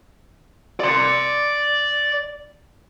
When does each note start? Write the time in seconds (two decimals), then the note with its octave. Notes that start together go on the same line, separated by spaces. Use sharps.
0.80 D5 C6